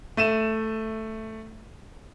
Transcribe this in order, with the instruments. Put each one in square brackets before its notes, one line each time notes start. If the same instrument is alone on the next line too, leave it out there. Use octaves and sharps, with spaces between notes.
[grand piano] A3 D#7 E7